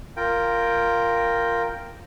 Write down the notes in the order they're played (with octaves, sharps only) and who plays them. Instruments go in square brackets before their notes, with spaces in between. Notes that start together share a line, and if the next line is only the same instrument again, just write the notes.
[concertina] F4 A#4 G5